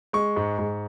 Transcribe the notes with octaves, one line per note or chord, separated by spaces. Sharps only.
G#3 C#6
G#2
G#2